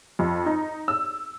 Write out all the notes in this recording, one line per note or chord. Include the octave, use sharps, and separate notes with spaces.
F2
D#4
E6